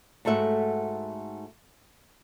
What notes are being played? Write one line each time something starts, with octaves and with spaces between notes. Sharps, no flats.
G#2 A3 F#4 E5 F#5